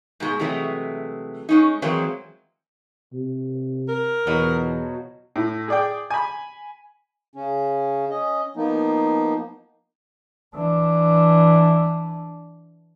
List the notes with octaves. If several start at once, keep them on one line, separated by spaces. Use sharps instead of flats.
G#2 B2 G#3
C3 E3 F#3 G#3 A3
G#3 C#4 D#4
E3 F#3 G#3 A#3 C4 C5
C3
A#4
E2 B2 F3 F#3
A2
G#4 D5 G5
G#5 B5
C#3 C#4
C#4 D#5
F3 A#3 B3 D#4
E3 D4